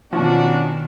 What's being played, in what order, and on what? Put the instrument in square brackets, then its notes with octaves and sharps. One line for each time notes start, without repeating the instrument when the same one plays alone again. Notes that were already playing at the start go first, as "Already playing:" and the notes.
[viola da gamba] B2 D#3 [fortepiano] F3 [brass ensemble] C#4 D4 F#4